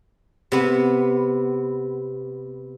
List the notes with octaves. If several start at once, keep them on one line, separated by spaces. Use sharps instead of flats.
C3 B3